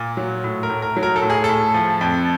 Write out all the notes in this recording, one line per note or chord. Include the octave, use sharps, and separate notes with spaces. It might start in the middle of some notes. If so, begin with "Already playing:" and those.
Already playing: A#2
F#3
A2
A#4
A2
A#4
F#3
A#4
A4
A2
G#4
A2 A4
F3
F2